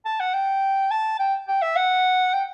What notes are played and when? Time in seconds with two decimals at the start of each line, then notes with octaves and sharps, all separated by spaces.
0.05 A5
0.20 F#5
0.34 G5
0.91 A5
1.19 G5
1.48 G5
1.62 E5
1.76 F#5
2.33 G5